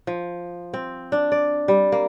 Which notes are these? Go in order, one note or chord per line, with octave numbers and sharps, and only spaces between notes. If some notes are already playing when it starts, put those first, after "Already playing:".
F3
C4
D4
D5
G3
A#3